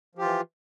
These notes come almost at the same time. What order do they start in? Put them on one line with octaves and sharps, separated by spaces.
F3 G4 F4 E3